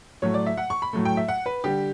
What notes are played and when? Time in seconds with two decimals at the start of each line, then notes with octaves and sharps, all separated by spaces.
0.22 A2 F#3 A3 C#5
0.34 D5
0.46 E5
0.57 F#5
0.70 C#6
0.82 B5
0.93 A2 F#3 A3
1.05 G5
1.17 E5
1.28 F#5
1.46 B4
1.64 D3 G3 G4